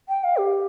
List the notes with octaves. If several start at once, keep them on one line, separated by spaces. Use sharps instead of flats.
G5
F5
G4